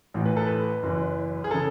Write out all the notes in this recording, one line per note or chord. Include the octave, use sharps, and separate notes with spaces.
A1 A2 E3
B4
A4
B4
F#1 F#2 E3
G#4
C#3 A4